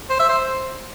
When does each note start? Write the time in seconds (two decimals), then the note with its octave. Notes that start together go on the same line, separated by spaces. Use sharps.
0.10 C5
0.19 E5
0.29 C5